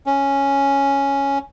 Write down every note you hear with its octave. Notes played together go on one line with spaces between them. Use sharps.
C#4